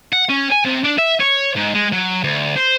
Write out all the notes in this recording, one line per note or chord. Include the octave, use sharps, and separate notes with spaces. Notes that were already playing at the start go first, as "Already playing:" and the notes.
F#5
C#4
G#5
C3
D4
E5
C#5
G#2
G#3
F#3
D2
C5